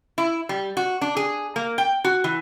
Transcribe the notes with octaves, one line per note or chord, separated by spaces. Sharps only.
E4
G3
F#4
D4
G#4
A#3
G5
F#4
E3